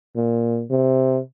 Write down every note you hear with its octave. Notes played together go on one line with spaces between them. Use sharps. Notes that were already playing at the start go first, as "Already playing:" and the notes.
A#2
C3